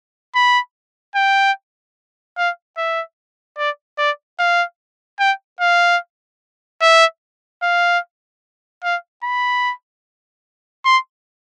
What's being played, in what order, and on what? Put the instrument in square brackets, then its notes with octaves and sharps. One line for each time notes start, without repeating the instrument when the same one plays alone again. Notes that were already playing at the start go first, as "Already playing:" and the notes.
[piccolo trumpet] B5
G5
F5
E5
D5
D5
F5
G5
F5
E5
F5
F5
B5
C6